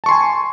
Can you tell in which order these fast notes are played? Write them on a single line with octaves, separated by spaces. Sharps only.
A5 C#6 C6 G#5